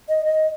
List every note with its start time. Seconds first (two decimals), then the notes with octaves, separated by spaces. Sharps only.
0.09 D#5
0.26 D#5